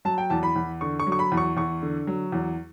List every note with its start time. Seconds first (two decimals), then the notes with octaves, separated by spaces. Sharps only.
0.05 F#3 A5
0.18 G5
0.30 E2 A5
0.43 B5
0.56 E2
0.81 D3 C#6
1.00 C#6
1.07 F#3
1.12 C#6
1.19 B5
1.32 E2
1.37 C#6
1.57 E2 C#6
1.82 D3
2.07 F#3
2.32 E2